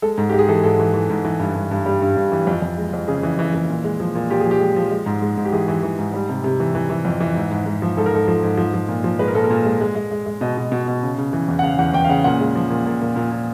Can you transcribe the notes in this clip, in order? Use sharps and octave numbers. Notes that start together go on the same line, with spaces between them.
G#3 A4
G#2
G#3 G4
G#4
E3 A4
G#2 A4
E3
E3
G#2
E3
G2
G2
G2
G3
G2
G2
E3
F2
F2
G#3
F2
C#3 G#4
E3
E3
E3
A#2
G#3
F3
A#2
A#2 G4
G#4
F3 G4
G#3
F3
G#3
G#2
G#3
G#2
G4
E3 G#4
E3
E3
G#2
G3
C3
C3
E3
E3
E3
F2
E3
G#2
G#2
G#2
F3
G#2 A4
A#4
G#2 A4
F3
G#2
F3
F3
A#2
F3
G#3 B4
A#4
A#2 A4
A#4
A#2
G#3
G#3
G#3
G#3
G#3
B2 D#5
B2
B2
B2
C#3
C#3
E3
E2
F#5
C#3 F5
E2 F#5
E2 G5
F5
C#3 F#5
A#2 F#5
G#3
F3
A#2
A#2
A#2
A#2
A#2